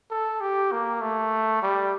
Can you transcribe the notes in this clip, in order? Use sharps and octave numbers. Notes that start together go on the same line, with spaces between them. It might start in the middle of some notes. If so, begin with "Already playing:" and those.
A4
G4
A#3
A3
G3